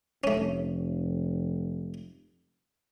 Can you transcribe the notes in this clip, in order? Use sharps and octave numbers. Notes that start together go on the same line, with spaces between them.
F1 A3 C#4